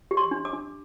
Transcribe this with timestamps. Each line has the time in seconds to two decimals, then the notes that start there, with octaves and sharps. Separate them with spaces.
0.11 G4
0.17 C6
0.31 D4
0.45 D6
0.53 D4